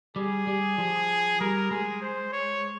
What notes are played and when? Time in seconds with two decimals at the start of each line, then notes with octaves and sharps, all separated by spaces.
0.16 G3 G#4
0.47 G3
0.78 F3
1.40 G3 A#4
1.71 G#3 G#4
2.02 C5
2.33 C#5